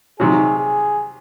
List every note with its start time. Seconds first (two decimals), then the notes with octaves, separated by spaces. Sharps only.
0.19 C3 D#3 F#3 G#4
0.59 G#4